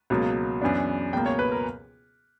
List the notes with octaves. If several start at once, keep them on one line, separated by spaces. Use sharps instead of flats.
C#2 B2 F#3 A#3
F#2 E3 B3 D4
C#2 B2 A#3 G5
C#5
B4
A#4